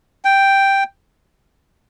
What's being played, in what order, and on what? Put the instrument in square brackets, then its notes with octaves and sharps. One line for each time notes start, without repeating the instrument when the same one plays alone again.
[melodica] G5